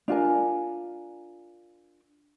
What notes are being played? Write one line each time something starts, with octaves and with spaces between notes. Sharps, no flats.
D4 F4 A#4 G#5